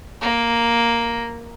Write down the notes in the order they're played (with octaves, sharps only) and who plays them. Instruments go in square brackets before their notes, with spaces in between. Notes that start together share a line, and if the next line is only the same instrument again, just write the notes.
[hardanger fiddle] A#3